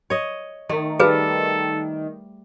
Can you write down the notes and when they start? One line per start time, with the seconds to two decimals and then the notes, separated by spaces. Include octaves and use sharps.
0.10 C#5 D#5
0.69 D#3 A3
1.00 G3 G#4 A4 B4